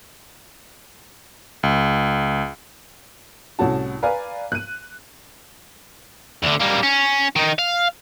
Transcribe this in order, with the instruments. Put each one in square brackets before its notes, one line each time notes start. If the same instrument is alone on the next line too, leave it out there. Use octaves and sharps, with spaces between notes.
[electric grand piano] C#2
[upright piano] C2 A2 C#4 F#4 A5
B4 D5 F5 G#5 A#5
F#6 D#7
[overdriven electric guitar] D2 D3
G3 A#3
C#4
D#3 D#4
F5